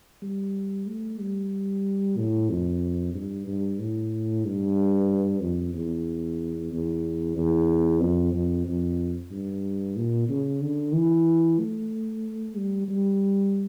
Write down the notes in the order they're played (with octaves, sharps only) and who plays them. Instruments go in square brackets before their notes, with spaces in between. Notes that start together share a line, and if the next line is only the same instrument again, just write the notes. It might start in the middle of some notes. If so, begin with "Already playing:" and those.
[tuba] G3
A3
G3
A2
F2
G2
G2
A2
G2
F2
E2
E2
E2
F2
F2
F2
G2
A#2
C#3
D3
E3
A3
G3
G3